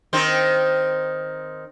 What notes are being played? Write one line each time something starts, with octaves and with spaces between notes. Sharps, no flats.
D#3 C4 C5